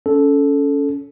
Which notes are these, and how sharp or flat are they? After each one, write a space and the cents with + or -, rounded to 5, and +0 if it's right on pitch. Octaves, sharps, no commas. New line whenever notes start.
C#4 +20 A4 -10